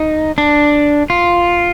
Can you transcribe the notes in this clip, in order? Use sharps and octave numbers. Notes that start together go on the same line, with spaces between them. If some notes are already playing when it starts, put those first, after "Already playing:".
Already playing: D#4
D4
F4